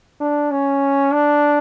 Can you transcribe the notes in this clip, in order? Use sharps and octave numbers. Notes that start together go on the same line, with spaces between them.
D4
C#4
D4